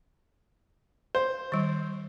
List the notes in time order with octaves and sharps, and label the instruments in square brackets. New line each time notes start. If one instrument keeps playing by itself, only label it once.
[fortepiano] C5
[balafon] D#3 G3